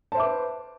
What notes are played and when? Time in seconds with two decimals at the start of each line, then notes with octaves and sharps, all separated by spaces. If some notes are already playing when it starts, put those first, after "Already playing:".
0.12 A5
0.14 C5
0.17 E5
0.20 D6
0.22 B4